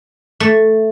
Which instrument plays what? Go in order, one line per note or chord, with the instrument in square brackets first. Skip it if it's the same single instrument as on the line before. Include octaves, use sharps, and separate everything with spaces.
[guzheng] A3